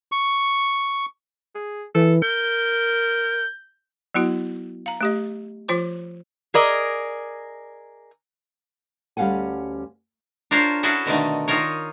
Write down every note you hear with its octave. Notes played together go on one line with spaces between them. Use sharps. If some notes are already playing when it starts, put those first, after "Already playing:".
C#6
G#4
E3 A4
A#4 G6
F#3 B3 E4 F#4
F5 A#5
A3 G4 D#5
F3 F4 C5 D6
G#4 A#4 D5 D#5
D2 G3 C#4 F5 F#5 G#5
D4 F4 A#4 C5 C#5
C#4 E4 F#4 G#4 A4 E5
B2 D3 D#3 A3
D#3 D#4 F4 A#4 C#5